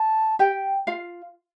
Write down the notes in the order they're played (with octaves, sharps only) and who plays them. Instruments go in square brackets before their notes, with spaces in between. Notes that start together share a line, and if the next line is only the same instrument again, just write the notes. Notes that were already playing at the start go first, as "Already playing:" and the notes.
Already playing: [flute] A5
[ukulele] G4 G5
F4 F5